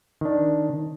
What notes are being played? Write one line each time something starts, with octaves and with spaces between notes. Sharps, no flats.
D#3 D4